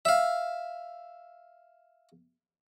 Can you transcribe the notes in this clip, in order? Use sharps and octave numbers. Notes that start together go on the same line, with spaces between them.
E5 F5